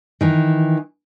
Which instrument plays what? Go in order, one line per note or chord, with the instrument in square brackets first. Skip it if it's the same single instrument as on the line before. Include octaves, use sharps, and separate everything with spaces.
[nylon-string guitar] D#3 E3